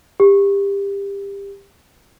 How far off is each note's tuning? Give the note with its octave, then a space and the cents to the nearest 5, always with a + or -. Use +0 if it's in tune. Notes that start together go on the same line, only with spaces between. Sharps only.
G4 +25